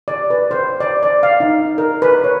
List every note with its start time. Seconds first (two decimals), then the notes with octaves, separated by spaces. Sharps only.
0.08 D5
0.30 B4
0.51 C5
0.80 D5
1.03 D5
1.23 F5
1.40 D#4
1.78 A#4
2.02 B4
2.24 C#5